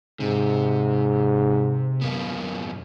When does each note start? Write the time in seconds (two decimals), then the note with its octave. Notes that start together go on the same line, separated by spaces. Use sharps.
0.20 G#2 C3
2.01 F#2 A#3 B3